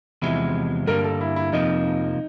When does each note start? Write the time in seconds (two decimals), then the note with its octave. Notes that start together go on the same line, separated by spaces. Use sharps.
0.22 E2 C3 F3 G#3 E4
0.87 G2 D3 G3 A#3 A#4
1.04 A4
1.21 E4
1.36 E4
1.52 F2 C3 F3 A#3 D#4